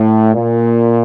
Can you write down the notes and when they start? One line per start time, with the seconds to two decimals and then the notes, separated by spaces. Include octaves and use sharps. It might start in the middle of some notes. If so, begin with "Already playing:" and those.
Already playing: A2
0.34 A#2